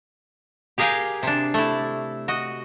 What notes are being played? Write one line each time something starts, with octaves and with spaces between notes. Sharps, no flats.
G4 G#4 A#4 F5 G5 G#5
C3 D4
A3 E4
F#4 D#5